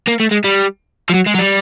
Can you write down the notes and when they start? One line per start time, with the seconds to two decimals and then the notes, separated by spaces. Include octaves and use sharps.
0.07 A#3
0.20 A3
0.31 G#3
0.44 G3
1.09 F3
1.14 F#3
1.26 G#3
1.34 F#3
1.39 G3